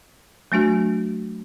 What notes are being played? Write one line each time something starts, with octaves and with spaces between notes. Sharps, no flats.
F#3 A3 D4 F#4